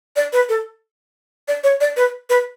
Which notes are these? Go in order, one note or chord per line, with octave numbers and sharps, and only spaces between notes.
D5
B4
A4
D5
C#5
D5
B4
B4